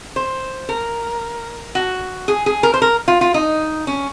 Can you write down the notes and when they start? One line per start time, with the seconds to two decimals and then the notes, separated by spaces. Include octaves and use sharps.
0.16 C5
0.69 A#4
1.75 F#4
2.28 G#4
2.46 G#4
2.63 A#4
2.74 C5
2.82 A#4
3.08 F4
3.21 F4
3.34 D#4
3.87 C#4